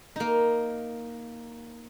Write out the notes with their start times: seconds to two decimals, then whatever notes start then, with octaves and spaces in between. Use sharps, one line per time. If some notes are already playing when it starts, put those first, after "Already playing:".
0.16 A#3 D#4